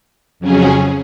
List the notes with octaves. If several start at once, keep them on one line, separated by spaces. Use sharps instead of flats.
F2 C#3 F#3 C#4 G#4